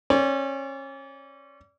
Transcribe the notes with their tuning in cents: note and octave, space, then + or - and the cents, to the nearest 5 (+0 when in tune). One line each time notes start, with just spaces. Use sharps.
C#4 -30 D5 -35